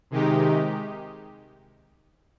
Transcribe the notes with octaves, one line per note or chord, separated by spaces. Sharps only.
C3 D#3 G#3 D#4 G4